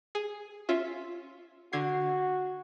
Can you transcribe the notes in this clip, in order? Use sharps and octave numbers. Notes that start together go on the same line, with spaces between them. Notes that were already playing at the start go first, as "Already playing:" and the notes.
G#4
C#4 F4 E5
D3 F#4 G#6 C7